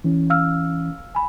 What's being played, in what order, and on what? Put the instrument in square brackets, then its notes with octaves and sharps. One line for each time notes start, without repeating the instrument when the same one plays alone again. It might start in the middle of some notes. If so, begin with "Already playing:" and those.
[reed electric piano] E3 C#4
[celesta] F5 E6 F6
G#5 B5